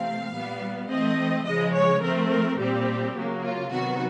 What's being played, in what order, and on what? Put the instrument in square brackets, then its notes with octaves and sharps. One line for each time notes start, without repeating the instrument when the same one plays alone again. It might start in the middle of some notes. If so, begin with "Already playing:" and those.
Already playing: [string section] C3 E3 A3 C4 F5
A#2 G3 B3
E3 A3 C4 D#5
C#3 F3 G#3 D#5
C#5
F3 A3 C4 A#4
A#4
A#2 G3 C4 G4
C#3 F#3 A#3
F4
C3 D#3 F#3 B3 F#4